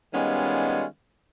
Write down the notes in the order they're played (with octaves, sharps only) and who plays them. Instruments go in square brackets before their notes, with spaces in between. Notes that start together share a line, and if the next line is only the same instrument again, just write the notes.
[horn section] D#3 G3 G#3 B3 C#4 F4